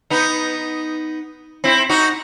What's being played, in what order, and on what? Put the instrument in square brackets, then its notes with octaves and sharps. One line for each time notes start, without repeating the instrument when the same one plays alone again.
[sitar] B3 D#4
C4 E4
D#4 F#4